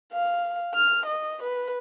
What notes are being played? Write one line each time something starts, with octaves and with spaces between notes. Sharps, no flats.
F5
F6
D#5
B4